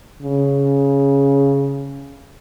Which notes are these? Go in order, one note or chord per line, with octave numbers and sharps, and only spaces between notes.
C#3